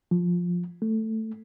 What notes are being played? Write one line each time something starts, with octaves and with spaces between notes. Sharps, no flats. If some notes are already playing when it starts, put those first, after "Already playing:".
F3
A3